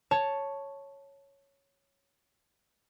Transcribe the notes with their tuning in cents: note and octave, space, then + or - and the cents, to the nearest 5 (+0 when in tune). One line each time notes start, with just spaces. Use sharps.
C#5 +0 A5 +0